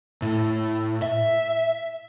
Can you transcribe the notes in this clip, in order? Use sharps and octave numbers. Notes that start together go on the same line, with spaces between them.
A2
E5